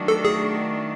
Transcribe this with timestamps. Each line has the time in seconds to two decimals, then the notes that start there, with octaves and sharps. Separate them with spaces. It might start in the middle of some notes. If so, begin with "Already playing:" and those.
Already playing: D#3 F#3 A3 D4 F#4
0.08 A4
0.25 G#4